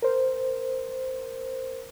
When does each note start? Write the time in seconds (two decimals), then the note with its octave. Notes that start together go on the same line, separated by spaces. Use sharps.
0.02 A#4 C5